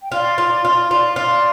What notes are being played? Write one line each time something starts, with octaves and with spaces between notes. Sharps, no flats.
G5
F4 D5 F5
F4
F4
F4 D5 F5
F4